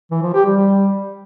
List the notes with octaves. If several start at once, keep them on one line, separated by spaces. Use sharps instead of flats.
E3
F3
G4
G3